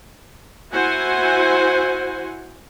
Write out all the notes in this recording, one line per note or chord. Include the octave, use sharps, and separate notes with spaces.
E4 F#4 C5 F#5 G#5